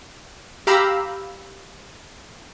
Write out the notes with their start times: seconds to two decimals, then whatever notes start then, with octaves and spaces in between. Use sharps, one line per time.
0.67 G4 F5 A#5 B5 E6